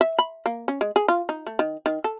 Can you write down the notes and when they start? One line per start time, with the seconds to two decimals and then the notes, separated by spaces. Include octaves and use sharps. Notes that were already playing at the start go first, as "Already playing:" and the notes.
0.01 E5
0.19 B5
0.46 A#3
0.68 C#4
0.81 G#3
0.96 G#4
1.08 F4
1.29 D#4
1.46 A3
1.59 D#3
1.86 D#3
2.04 A4